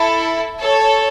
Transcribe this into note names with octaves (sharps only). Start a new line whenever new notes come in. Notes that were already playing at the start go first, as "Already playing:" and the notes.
Already playing: E4 A4
A4 C#5